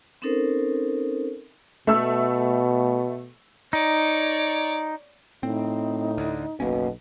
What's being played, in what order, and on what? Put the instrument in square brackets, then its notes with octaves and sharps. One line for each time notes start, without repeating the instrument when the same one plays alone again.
[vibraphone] C4 C#4 D#4 A4 A#4 C5
[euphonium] B2 [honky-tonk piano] A3 E6
[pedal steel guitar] D#4 [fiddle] C#5 D5
[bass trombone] A2 [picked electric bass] C4 [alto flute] D#4
[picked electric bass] D2
[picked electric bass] F#1 A#3 C#4 [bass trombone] B1 [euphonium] B2